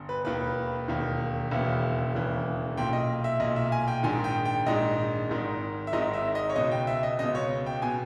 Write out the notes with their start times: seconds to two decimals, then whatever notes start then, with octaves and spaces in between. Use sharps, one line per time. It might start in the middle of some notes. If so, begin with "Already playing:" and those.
Already playing: G1
0.09 B4
0.25 E1 D#2 D#3 B4
0.88 E1 D#2 D#3
1.51 E1 D#2 C#3 E3
2.14 E1 D#2 C#3 E3
2.77 B1 A#2 G5
2.93 D#5
3.24 E5
3.40 B1 A#2 D#5
3.56 E5
3.72 G#5
3.88 G5
4.03 A#1 G#2 D#3 G#5
4.24 G5
4.45 G5
4.66 A#1 G#2 D#3 D#5
5.29 G#1 G#2 D#3
5.87 E5
5.93 G#1 G#2 D#3 D#5
6.14 E5
6.35 D#5
6.50 C#5
6.56 C#2 B2 D#5
6.72 G5
6.87 E5
7.03 D#5
7.19 C#2 B2 D#5
7.35 C#5
7.66 G5
7.82 B2 G#5